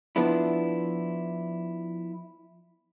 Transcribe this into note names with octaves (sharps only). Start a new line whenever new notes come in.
F3 B3 D4 E4